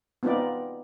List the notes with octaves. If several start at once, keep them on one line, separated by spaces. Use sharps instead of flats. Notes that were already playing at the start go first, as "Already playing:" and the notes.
B3 C4 D#4 F4 B4 D5